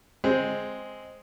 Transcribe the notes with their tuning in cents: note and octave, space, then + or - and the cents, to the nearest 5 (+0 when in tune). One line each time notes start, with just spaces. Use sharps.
G#3 +0 C4 +0